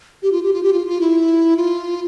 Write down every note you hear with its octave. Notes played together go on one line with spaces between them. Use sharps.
G4
F4
G4
F4
G4
F4
F4
E4
F4